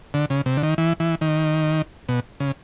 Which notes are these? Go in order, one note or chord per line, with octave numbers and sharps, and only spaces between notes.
D3
C#3
C3
D3
D#3
E3
E3
D#3
B2
C#3